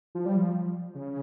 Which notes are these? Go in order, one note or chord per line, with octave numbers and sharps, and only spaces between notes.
F3
G3
F3
C#3